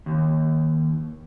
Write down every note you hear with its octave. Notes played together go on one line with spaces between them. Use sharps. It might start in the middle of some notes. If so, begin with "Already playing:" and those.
D#2